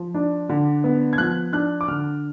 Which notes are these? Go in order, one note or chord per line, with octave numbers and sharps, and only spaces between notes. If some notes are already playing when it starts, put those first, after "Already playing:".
Already playing: F3
D4
D3
B3
G#6
F3 F#6
D4 F#6
D6
D3 F6